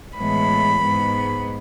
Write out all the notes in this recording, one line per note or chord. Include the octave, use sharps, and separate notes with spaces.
A2 E3 G#3 B3 B5
G#2 G#3 B3